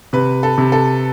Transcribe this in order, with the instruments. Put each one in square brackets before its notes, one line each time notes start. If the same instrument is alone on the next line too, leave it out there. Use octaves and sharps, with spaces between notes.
[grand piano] C3 [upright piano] B4
[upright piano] A4
[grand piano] C3
[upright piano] A4